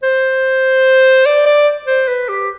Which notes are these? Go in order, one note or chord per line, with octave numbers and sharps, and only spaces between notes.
C5
D5
D5
C5
B4
G4